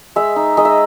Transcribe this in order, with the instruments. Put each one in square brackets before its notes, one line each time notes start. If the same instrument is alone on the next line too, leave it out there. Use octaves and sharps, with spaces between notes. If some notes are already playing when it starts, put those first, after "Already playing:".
[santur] G#3 E5
D#4
G#3 D#5
E5